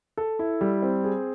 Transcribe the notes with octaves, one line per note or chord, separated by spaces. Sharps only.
A4
E4
G3
C4
G#4